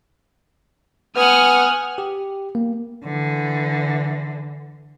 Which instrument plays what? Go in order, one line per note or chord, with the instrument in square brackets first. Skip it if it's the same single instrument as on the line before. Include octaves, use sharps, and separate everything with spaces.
[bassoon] B3 [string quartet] F#5 C#6 [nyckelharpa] G#5 [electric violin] D#6 F6
[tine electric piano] G4
A#3
[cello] D3 E3